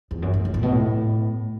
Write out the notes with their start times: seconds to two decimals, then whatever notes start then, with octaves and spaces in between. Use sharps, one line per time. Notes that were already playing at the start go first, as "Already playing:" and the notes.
0.11 E2
0.22 F#2
0.34 A2
0.45 G#2
0.54 A2
0.63 B2
0.71 A2